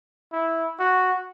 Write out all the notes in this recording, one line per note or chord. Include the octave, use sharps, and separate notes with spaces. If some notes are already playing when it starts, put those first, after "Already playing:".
E4
F#4